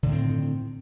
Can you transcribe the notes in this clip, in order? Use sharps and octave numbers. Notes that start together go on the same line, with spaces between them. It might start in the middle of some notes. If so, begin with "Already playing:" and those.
A2 D3 D#3 C4